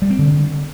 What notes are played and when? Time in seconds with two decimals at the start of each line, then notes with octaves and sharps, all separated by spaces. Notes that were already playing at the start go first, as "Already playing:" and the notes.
0.02 G3
0.10 C4
0.19 D3